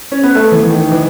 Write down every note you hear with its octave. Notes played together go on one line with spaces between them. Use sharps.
C#4
B3
A3
E3
E3
D#3
D#3
E3